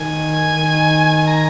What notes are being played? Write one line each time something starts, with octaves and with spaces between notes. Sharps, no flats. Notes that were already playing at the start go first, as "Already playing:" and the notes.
Already playing: D#3 G#5
D#3
A#5